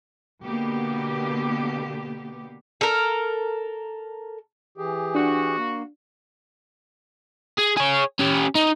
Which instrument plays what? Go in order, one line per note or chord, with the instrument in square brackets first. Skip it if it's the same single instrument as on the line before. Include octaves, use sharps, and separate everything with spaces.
[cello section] B2 D3 A#3 B3 G4
[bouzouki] A4 A#4
[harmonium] E3 G4 G#4
[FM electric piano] D4 [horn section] F#4
[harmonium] A#3
[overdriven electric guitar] G#4
G#4 C#5
C#4 G4
D#4